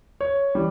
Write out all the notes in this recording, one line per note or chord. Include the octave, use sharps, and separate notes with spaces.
C#5
E3 G3